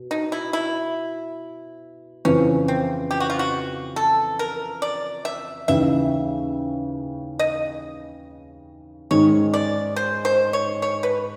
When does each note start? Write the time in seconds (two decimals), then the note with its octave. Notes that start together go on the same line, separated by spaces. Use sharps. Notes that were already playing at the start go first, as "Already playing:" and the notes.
Already playing: B2
0.11 D#4
0.32 E4
0.53 E4
2.25 F2 C#3 E3 C#4
2.68 C4
3.11 G4
3.20 F#4
3.30 F4
3.39 F#4
3.96 A4
4.39 A#4
4.82 D5
5.25 E5
5.68 D#2 C#3 E3 E5
7.39 D#5
9.11 G#2 D#3 G#3 C#4 C#5
9.54 D5
9.96 C5
10.25 C5
10.53 C#5
10.82 C#5
11.03 B4